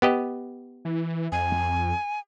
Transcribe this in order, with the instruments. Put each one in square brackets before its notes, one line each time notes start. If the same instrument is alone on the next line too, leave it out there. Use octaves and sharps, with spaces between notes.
[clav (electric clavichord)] B3 G4 D#5
[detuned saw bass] E3
[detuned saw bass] F2 [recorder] G#5